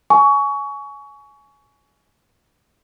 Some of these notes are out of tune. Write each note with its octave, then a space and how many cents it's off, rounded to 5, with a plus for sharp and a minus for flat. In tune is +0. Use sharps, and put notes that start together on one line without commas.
G#5 +20 C#6 +25